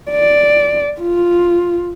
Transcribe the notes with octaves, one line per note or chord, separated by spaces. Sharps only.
D5
F4